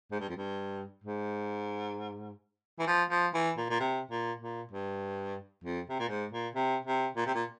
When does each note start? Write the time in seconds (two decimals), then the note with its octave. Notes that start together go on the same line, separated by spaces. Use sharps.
0.12 G#2
0.21 G2
0.29 F2
0.37 G2
1.04 G#2
2.79 E3
2.87 F3
3.11 F3
3.34 E3
3.57 A#2
3.70 A#2
3.80 C3
4.11 A#2
4.41 A#2
4.72 G2
5.64 F2
5.89 C3
5.99 A#2
6.09 G#2
6.32 A#2
6.55 C3
6.85 C3
7.17 A#2
7.26 C3
7.35 A#2